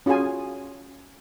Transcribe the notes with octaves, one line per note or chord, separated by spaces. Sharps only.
C#4 F4 F#4 G#4 G#5